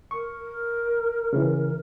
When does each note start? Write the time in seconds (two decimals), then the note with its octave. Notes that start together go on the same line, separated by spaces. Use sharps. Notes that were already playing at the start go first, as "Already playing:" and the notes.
0.11 A#4 C#6
1.33 C#3 E3